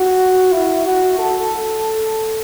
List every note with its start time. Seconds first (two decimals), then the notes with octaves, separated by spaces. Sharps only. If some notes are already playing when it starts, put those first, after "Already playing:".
Already playing: F#4
0.53 E4
0.86 F#4
1.19 A4